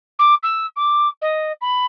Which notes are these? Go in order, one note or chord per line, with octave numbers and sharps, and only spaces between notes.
D6
E6
D6
D#5
B5